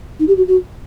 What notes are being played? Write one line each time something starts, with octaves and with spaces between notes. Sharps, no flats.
D#4
G4
F#4
F#4